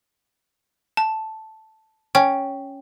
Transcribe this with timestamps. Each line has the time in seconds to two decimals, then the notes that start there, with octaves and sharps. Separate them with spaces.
0.97 A5
2.15 C#4 G5